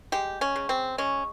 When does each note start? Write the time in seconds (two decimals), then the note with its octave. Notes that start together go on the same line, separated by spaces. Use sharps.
0.12 G#3 G4
0.41 C#4
0.56 C#3
0.69 C4
0.98 G#3 C#4